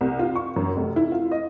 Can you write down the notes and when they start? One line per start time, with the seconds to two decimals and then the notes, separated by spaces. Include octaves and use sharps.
0.01 C2
0.19 F4
0.35 C#6
0.56 F#2
0.76 F1
0.96 E4
1.12 F4
1.31 D#5